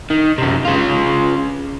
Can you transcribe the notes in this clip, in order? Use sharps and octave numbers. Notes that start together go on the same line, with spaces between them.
D#3
F#2 C3
C#3 F4